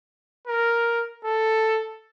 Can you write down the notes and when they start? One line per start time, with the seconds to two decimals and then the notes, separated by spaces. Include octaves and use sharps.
0.47 A#4
1.25 A4